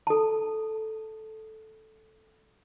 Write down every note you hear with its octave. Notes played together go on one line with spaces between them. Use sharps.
A4 A5